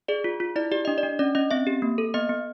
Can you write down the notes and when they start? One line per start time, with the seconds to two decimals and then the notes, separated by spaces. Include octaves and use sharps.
0.08 G#4 D5
0.24 F4
0.40 F4
0.56 E4 D5
0.72 G4 D5
0.85 D4 D#5
0.98 D5
1.03 D4
1.19 C#4 D5
1.35 C#4 D#5
1.51 C4 E5
1.67 G4
1.82 A#3
1.98 A4
2.14 B3 D#5
2.29 B3